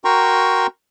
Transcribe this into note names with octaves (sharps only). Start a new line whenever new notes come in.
F#4 A#4 G5 A#5 C6 C#6